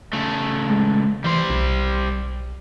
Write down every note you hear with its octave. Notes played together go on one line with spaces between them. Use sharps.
C#3 A3
G#3
E3 G3 C5
B1